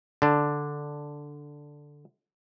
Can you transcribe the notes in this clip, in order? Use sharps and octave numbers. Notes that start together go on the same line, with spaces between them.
D3 D4